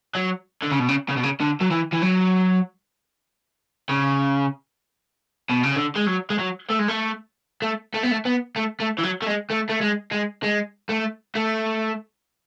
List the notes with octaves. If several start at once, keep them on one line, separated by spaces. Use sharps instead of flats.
F#3
D3
C#3
B2
C#3
C#3
B2
C#3
D3
F#3
E3
E3
F#3
C#3
B2
C#3
D3
G#3
F#3
G#3
F#3
A3
G#3
A3
A3
A3
B3
A3
B3
A3
A3
E3
F#3
A3
G#3
A3
A3
G#3
G#3
G#3
A3
A3